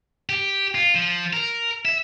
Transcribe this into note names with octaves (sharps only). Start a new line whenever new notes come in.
G4
F4
F3
A#4
E5